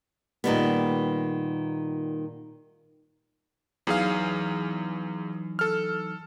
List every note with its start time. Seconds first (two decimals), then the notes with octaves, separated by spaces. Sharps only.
0.44 A#2 D#3 G3 B3
3.87 E2 E3 F#3 D#4 G#4 F5
5.59 A4 F6